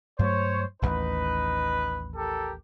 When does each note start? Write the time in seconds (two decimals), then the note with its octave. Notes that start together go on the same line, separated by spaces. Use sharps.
0.19 G2 F#3 A3 C5 C#5
0.82 D1 A1 D#2 D#4 B4
2.15 G4 A4 A#4